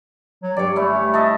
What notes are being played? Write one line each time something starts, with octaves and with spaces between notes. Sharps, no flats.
F#3
G2 C#5 D5
A3 C#4 E4
D#5 E5 A5